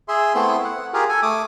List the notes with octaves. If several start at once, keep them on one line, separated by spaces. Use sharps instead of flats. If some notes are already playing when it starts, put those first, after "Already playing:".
G#4 E5 C6
A3 B3 C4 E4 C6
F#5
F4 G4 G#4 A#4
A4 G#5
A3 D6 D#6